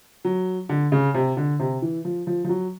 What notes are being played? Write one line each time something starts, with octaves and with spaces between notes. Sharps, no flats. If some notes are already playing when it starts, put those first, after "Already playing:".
F#3
D3
C#3
C3
D3
C3
E3
F3
F3
F3
F#3